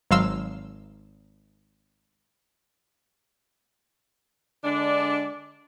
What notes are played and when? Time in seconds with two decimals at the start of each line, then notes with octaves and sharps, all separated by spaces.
0.11 G#1 F#3 F5 C6 E6 F6
4.63 D3 G#3 D4